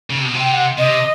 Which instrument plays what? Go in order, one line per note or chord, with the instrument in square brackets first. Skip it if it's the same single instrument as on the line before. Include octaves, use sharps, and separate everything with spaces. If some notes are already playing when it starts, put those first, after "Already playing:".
[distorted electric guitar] C#3
C3
B2
C3
[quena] G5
F#5
[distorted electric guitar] C3 [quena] D#5